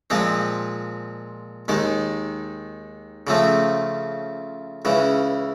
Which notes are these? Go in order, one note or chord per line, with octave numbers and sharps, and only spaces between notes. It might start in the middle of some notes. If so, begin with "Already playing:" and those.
A#2 F3 G#3 C4
D#2 D#3 G#3
C#3 F3 A3 C4
C#2 C#3 E3